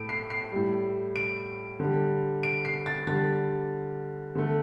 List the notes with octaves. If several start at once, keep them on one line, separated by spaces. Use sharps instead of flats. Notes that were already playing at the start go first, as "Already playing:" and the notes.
Already playing: A2 A3 D7
C7
C7
A2 G3
D7
D3 G3
D7
C7
A6
D3 G3 A6
D3 A3